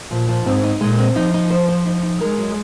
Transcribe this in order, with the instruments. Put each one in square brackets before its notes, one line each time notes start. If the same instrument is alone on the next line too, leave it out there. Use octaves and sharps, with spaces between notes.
[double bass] A#2 [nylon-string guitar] F3
[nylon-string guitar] F3
[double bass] G#2 [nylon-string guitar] C4
[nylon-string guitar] D#4
[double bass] A#2 [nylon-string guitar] G#3
[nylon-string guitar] C4
[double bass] F3 [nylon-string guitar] D#4
[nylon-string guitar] D#4
C5
C5
D#4
D#4
[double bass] G#3 [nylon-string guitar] A#4
[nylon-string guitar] F#3